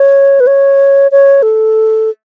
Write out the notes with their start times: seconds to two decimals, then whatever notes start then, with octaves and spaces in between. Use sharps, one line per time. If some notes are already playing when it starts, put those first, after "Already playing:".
Already playing: C#5
0.40 B4
0.47 C#5
1.12 C#5
1.43 A4